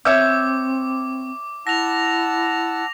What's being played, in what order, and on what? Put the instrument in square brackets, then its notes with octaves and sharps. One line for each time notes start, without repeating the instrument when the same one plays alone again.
[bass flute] C4 [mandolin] C#5 E5 G6 [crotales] D6
[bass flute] E4 [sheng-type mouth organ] F#5 A5 E6 [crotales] A#6 F7